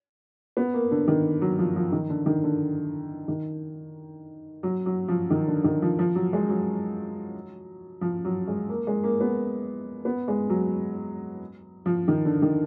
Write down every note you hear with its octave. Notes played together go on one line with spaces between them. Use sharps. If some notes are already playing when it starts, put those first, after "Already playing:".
B3
A#3
D3
D#3
F#3
F3
F3
D#3
D3
D#3
D3
D#3
F#3
F#3
F3
D#3
D3
D#3
F3
F3
F#3
G#3
F#3
F3
F#3
G#3
A#3
G#3
A#3
B3
B3
G#3
F#3
F3
D#3
D3
D#3